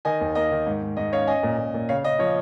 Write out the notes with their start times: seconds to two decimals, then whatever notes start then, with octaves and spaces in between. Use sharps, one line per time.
0.05 D#3 D#5 G#5
0.21 D#2
0.35 A#3 D#5
0.52 D#3
0.66 G#2
0.82 G#2
0.97 G#2 D#5
1.12 C#4 C#5 F5
1.27 C#4 D#5 G#5
1.43 A#2
1.58 A#2
1.74 A#2
1.89 C#3 C#5 F5
2.04 C#3 D#5
2.19 F3 C#5